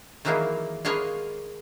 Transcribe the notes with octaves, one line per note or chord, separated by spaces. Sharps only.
D#3 E3 F#3 G#3 A#3 B3
G#3 A#3 B3 C#5 D#5 F5